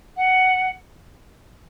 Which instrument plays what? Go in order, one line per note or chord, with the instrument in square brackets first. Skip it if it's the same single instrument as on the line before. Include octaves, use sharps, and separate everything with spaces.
[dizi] F#5